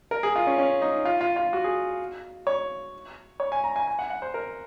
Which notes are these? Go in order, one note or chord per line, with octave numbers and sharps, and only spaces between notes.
A#4
G#4
F4
C#4
C#4
D#4
F4
F4
F4
F#4
G#4
C#5
C#5
G#5
A#5
G#5
G#5
F#5
F#5
C5
A#4